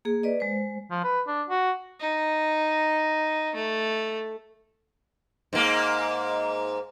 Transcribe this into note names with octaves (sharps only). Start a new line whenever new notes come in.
A#3 G#4
B4 D5 D#5
G#3 C5
F3
B4
D4
F#4
D#4
A3
G#2 A#3